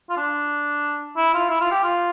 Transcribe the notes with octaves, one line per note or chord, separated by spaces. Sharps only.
F4
D4
E4
F4
E4
F4
G4
F4